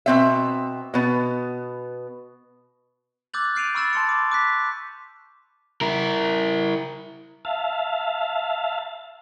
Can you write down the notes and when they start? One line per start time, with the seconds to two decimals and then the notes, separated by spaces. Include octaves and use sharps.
0.06 B2 C4 E5
0.94 B2 B3
3.34 D6 E6 F#6 G6 A6 F#7
3.55 F6 G6 C7 D7 D#7 F7
3.75 B5 C#6 E6 F6 A6 E7
3.93 A5 C6 E6 C#7
4.08 B5 D6
4.32 D6 F#6 B6
5.81 E4 A#4
7.45 E5 F5 A5